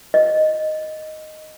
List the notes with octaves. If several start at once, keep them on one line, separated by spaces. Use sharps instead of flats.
D#5